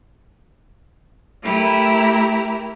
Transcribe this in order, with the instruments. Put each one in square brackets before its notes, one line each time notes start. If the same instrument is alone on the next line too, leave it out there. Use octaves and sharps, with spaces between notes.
[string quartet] A3 E4 G4 A#4